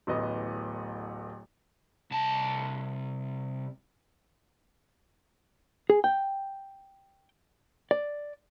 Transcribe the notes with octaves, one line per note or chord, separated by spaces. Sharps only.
D1 A1 B3 D#5
C2 A5
G#4
G5
D5